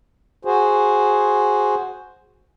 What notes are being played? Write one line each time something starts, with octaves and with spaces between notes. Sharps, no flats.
F#4 G#4 C5